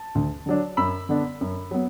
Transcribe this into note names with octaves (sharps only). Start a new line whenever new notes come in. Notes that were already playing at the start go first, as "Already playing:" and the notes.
Already playing: A5
D2
D3 F#3 D4
F#2 B5 E6
D3 B3 D4
F#2
F#3 B3